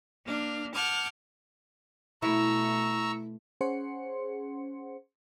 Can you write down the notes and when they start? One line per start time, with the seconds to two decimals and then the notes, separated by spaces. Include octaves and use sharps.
0.25 A#3 D4 F6
0.73 F#5 A5 D6 F6 G6 G#6
2.22 B2 A3 E4 A#5 C#6 E6
3.61 C#4 G#4 C5 F#5 C6 C#7